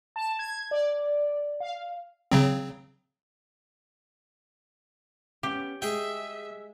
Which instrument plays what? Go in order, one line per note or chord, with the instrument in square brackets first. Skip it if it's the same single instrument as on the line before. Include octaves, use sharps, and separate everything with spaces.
[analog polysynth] A5
G#6
D5
F5
[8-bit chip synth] C#3 F#3 C4
[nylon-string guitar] B3 C#4 [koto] G4
[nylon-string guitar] G#3 [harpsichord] G#4 G5 [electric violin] E5